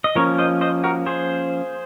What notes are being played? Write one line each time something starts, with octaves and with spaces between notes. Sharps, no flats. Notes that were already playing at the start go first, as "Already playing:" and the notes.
D#5
F3 A#3 C#4 A#4 C#5
C5 D#5
C5 D#5
F#4 A#4
G#4 C5